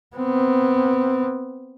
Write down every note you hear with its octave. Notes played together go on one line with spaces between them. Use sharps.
B3 C4